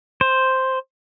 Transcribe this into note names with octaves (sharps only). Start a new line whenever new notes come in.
C5